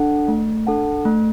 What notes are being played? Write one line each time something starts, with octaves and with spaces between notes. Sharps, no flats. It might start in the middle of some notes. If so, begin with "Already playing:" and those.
Already playing: D4 A4 F#5 A5
A3
D4 A4 F#5 A5
A3